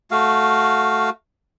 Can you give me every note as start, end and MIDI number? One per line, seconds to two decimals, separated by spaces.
0.11 1.10 57
0.11 1.10 66
0.11 1.10 77